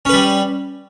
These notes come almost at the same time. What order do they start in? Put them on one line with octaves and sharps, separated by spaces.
C#4 B4 G3